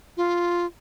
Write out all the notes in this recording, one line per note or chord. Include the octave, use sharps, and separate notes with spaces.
F4